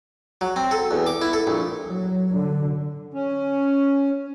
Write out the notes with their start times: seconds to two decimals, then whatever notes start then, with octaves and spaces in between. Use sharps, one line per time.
0.41 F#3
0.56 C4
0.71 A4
0.91 E2
1.06 D6
1.21 E4
1.33 A4
1.47 A#1
1.88 F#3
2.35 D3
3.14 C#4